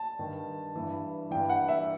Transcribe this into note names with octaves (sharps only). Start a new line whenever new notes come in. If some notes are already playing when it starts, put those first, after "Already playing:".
Already playing: A5
G2 D#3
G2 E3
G2 E3 G5
F#5
E5